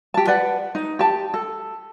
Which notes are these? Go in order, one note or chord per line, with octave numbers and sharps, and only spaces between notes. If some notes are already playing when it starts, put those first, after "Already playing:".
G4 A5
B4 D5 F#5
D#4
G4 A5
A4